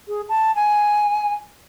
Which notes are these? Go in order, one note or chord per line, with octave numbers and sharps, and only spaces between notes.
G#4
A5
G#5